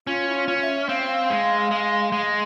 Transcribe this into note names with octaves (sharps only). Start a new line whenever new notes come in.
C#4 F4
E4
F4
C#4
E5
C4 F5
F5
G#3
G#3
G#3